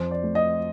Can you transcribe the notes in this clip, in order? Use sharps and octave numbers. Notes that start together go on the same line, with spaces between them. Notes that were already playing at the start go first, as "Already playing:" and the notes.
Already playing: F2 C5
D5
A3
D#5